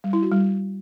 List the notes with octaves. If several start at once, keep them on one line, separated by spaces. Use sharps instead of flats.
G3
E4
F#4
G3